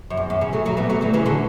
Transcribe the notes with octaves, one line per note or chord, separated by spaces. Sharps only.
F#2
E2
F#2
C#3
F#3 A3
F#3 A3
G3 B3
F#3 A3
E3 G3
C#3 E3
D3 F#3